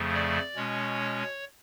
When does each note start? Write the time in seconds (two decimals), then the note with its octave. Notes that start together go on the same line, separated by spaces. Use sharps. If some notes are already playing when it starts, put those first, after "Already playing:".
Already playing: F2 C#3 F3 A3
0.14 D5
0.55 B2 G#3 C#4 C#5